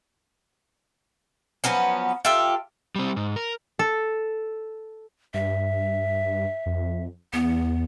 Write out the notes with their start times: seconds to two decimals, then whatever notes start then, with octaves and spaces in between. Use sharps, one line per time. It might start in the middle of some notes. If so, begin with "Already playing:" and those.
1.64 F3 F#3 B3 C#4
2.25 F4 G4 A4 E5
2.96 G3 C4
3.16 G#2
3.36 A#4
3.79 A4
5.34 G2 E5
6.66 F2
7.33 E2 B3